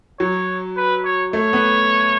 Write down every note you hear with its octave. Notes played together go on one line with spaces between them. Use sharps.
F#3 C#5
B4
C#5
A3 C#5
B3